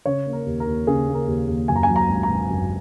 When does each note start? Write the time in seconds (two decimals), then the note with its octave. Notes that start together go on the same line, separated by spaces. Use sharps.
0.06 C#3 C#5
0.26 A#3
0.33 A#4
0.46 D#2
0.60 A#4
0.67 D#2
0.87 C#3 G#4
1.08 A#3
1.15 A#4
1.28 D#2
1.48 D#2
1.68 F#2 G#5
1.76 A#5
1.83 G#5
1.89 F#3
1.96 A#5
2.09 G#1
2.23 A#5
2.30 G#1
2.51 F#2